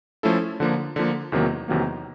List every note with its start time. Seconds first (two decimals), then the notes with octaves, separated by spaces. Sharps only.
0.23 F3 A3 C#4 E4 A4
0.60 D3 F3 A#3
0.96 D3 F3 A#3
1.32 E2 C3 D#3 F#3 A#3
1.68 E2 C3 D#3 F#3 A#3